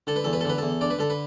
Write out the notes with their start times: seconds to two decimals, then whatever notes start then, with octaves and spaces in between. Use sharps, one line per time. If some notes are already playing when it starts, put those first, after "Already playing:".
0.07 D3 A4
0.16 B4
0.24 E2 A4
0.33 B4
0.41 A4
0.45 D3 B4
0.58 E2 A4
0.81 D3 D5
0.90 B4
0.99 D3 A4
1.10 B4